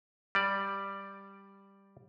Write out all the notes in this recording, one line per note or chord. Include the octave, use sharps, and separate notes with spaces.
G3 D5